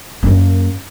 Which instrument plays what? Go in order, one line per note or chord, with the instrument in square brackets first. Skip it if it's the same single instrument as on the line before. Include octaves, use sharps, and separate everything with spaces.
[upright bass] F#2 A#3